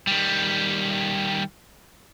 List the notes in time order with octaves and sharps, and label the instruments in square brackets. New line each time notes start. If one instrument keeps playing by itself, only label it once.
[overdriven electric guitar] D#3 G3